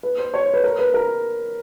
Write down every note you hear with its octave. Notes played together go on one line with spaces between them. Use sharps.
B4
C5
C#5
C5
B4
A#4
B4
A#4